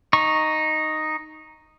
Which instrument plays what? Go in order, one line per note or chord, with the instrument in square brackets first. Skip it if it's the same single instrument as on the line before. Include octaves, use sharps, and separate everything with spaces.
[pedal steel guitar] D#4 C#6